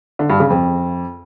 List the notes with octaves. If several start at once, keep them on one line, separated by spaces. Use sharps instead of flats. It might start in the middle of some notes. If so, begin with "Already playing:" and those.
D3
G2
C#3
F2